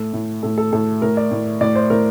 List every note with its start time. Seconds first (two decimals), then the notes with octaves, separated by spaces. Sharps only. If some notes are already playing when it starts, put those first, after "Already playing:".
Already playing: A2 A4
0.13 A2
0.43 A2 A4
0.58 A4
0.73 A2 A4
1.02 A2 A#4
1.17 D5
1.31 A2
1.61 A2 D5
1.75 C5
1.90 A2 A#4